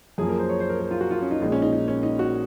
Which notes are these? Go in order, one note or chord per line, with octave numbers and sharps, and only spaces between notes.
F#2 F3 A#3 G#4
A#4
C5
C#5
C5
A#4
A#4
F4
F#4
F4
C#4
D#4
A#1 A#2 G#3 D#4
C#4
D#4
D#4
C#4
D#4
F#4